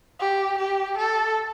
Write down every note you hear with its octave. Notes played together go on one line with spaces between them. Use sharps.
G4
G4
A4